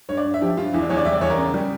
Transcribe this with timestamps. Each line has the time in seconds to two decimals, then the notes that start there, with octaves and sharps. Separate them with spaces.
0.09 G2 C#5
0.17 D5
0.25 G2
0.34 E5
0.41 F3 G4
0.57 G2 F4
0.73 E2 E4
0.82 D4
0.89 E2 C#5
0.97 D5
1.05 G3 E5
1.13 D5
1.21 E2 C#5
1.30 A#4
1.37 C#3
1.54 G3